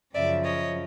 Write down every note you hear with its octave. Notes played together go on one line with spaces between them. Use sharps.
F#2 C#3 F3 D5 E5
C#5 D#5